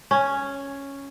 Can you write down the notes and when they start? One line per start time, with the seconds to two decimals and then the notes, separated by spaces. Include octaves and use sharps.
0.11 C#4